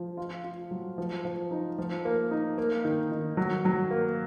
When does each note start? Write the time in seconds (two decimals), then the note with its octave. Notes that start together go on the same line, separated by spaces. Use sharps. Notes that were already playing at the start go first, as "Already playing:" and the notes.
Already playing: F3
0.17 F4
0.44 F4
0.71 F#3
0.98 F3
1.25 F3
1.51 D#4
1.78 F3
2.05 A#3
2.31 D#4
2.58 A#3
2.85 D#3
3.12 D#3
3.37 F#3
3.65 F#3
3.91 A#3